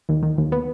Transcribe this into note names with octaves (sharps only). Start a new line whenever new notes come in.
D#2
D#3
D#2
B3